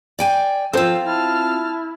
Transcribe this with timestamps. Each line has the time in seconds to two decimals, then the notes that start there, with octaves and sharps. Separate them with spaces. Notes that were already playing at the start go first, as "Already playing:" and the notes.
0.19 D5 G5 G#5
0.73 F3 C4 F4 A4 C5 E6
1.06 E4 A5 F6